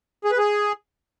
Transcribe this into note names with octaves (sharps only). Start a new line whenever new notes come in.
G#4
B4
G#4